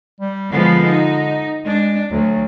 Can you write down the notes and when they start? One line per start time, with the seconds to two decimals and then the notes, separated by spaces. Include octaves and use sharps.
0.21 G3
0.53 D3 F3 G#3 B3
0.86 D#4
1.65 G#3 D4
2.11 D2 F#3